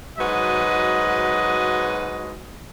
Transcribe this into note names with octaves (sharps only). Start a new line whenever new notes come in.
G#2 F#3 F#4 B4 D#5